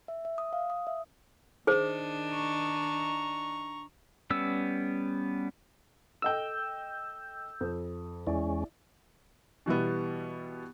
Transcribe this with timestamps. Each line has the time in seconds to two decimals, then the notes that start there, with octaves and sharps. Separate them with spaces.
0.08 E5
0.25 E5
0.38 D#6
0.53 F5
0.70 D#6
0.87 E5
1.67 D#3 D4 D#4 G#4 C5
2.30 A#5 C#6
4.30 G3 B3 C#4 E6
6.22 A4 D#5 G5 E6 G6
7.61 F2
8.27 E2 G#3 C#4 E4 D5
9.66 B2 E3 G3 B3